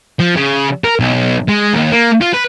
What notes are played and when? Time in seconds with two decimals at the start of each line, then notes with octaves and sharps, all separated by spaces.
0.20 F3
0.36 C#3
0.84 A#4
0.99 B1
1.48 G#3
1.74 D#2
1.92 A#3
2.21 F4
2.34 B4